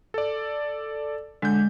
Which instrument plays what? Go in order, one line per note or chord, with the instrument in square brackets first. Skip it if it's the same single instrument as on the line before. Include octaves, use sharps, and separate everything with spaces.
[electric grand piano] A4 D5
[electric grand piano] D3 G6 [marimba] G#3